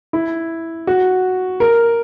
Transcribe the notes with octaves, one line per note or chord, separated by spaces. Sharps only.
E4
F#4
A#4